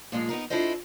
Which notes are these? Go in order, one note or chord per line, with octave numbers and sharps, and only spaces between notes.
A#2 F3 G#3 A#3
B3 D#4 A#4
D4 E4 F4 A4 C5 D#5